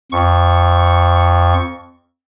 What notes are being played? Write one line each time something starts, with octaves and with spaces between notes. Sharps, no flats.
F2 C#6